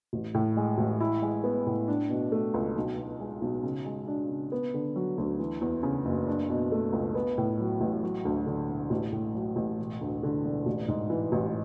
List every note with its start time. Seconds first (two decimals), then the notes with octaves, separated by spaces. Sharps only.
0.13 A1
0.34 A2
0.57 G#3
0.78 A1
1.00 E4
1.22 G#3
1.44 B3
1.67 A2
1.88 D4
2.10 B2
2.32 A3
2.54 C#2
2.76 B1
2.97 B2
3.20 G#3
3.42 B1
3.63 C#3
3.85 G#3
4.07 D4
4.29 C#3
4.52 B3
4.74 D3
4.96 F#3
5.18 D2
5.39 E3
5.61 E2
5.83 C#3
6.05 F#1
6.27 D4
6.49 B2
6.72 A3
6.93 C#2
7.15 B3
7.38 A2
7.60 F#3
7.81 A1
8.03 F#3
8.25 D2
8.46 D3
8.69 E1
8.90 A1
9.12 A2
9.35 F#3
9.56 A1
9.79 E1
10.01 D2
10.23 D3
10.45 E1
10.66 A1
10.88 G#2
11.10 E3
11.32 A1